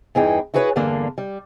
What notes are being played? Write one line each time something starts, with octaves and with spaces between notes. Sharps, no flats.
E2 G2 E3 D#4 G#4 G5
E4 F#4 G#4 B4 C#5
E2 G2 D3 A#3 D4
G3